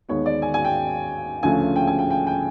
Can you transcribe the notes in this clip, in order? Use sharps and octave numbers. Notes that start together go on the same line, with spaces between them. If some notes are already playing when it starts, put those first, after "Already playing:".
D#2 D#3 G#3 B3 C#5
D5
G#5
G#5
G5
D2 C#3 F3 A3 C#4 G#5
G5
G#5
G5
G5
G5